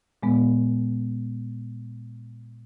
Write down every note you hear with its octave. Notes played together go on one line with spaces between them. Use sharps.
A#2 G#3 B3